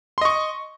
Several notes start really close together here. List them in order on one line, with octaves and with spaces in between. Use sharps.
C6 D#5 C#6